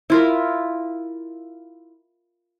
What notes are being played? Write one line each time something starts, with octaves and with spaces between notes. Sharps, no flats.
E4 F4 A#4